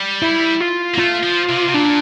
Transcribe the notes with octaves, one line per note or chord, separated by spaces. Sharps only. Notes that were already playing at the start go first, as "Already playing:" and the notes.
Already playing: G3
E4
F4
A#3
A3 F4
F3
C3
C3
A#2 D4